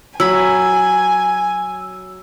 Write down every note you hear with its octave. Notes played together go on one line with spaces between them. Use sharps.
F#3 G#5 B5 E6